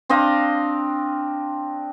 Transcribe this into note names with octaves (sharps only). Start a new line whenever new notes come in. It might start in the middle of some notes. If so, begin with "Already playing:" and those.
C4 D4 D#5 F5